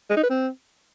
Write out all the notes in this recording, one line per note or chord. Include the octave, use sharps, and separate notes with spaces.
G#3
D#4
B4
C4